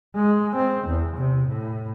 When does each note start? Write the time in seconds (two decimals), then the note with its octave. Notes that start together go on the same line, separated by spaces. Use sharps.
0.15 G#3
0.55 C4
0.87 E2
1.17 C3
1.48 A2